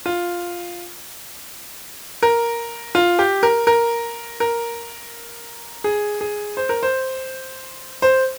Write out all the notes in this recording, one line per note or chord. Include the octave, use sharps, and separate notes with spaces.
F4
A#4
F4
G4
A#4
A#4
A#4
G#4
G#4
C5
A#4
C5
C5